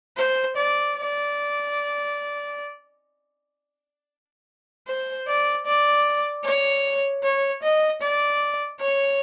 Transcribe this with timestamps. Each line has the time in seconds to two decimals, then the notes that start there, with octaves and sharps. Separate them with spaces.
0.18 C5
0.57 D5
0.97 D5
4.88 C5
5.28 D5
5.67 D5
6.45 C#5
7.23 C#5
7.63 D#5
8.02 D5
8.80 C#5